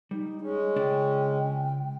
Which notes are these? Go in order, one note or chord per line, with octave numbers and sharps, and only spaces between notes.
G3 D#4
G#3 C#4 G#4
C#2 D4 D5 G5